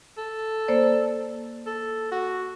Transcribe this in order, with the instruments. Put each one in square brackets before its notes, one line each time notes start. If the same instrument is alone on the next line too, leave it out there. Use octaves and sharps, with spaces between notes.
[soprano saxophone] A4
[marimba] A#3 C5 D5
[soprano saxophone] A4
F#4